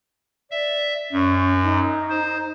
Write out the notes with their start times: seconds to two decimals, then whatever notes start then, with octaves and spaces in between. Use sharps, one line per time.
0.51 D5 E5
1.12 F#2 C#4
1.63 D#4
2.10 C5